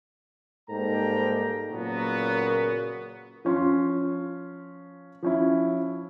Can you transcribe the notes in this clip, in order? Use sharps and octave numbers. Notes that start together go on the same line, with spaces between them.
G#2 G3 A#3 A4 G5 A#5
A#2 C#3 F#3 A#3 B3 F#4
F3 C#4 F4 C6
F3 C#4 E4